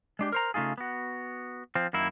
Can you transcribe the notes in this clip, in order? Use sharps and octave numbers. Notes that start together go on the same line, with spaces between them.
G#3 D4 G4
A#4 C5 A#5
C#3 A3 D#4 F4 G#4
B3 F#4
F3 C4
F#2 D#3 A#3 E4